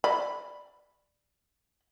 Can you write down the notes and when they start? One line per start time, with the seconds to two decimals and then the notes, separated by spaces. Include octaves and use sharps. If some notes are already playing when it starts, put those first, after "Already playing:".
0.04 D5 B5